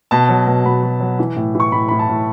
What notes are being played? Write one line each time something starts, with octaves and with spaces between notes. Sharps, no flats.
B2 A5
F#3
B2
B2 B5
F#3
F#3
E3
A2
E3 C#6
A2 B5
A2 B5
A5
A2